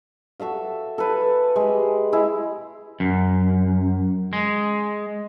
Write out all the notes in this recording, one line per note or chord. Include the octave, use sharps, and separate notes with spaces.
F#4 A4 E5 F5
A4 B4 G#5
G#3 G4
G#3 E4
F#2
G#3